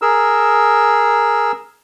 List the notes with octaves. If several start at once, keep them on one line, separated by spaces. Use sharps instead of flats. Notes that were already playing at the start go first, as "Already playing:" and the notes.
G#4 A#4 E6